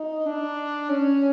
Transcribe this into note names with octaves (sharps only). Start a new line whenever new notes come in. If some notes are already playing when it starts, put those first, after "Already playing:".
Already playing: D#4
D4
C#4